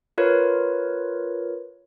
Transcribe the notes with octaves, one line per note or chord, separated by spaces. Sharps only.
F4 A#4 B4 C#5